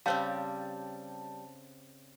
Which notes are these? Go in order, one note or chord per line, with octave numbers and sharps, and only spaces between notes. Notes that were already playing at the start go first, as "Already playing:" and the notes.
C#3 G3 C4 G4 C5 C#5 F5 A5